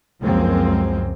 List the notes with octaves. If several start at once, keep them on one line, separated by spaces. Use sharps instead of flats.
C#2 F#2 F3 G#3 A#3 C4